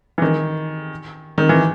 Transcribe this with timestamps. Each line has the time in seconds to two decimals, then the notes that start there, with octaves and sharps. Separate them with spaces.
0.18 E3
0.22 D#3
1.38 D#3
1.49 E3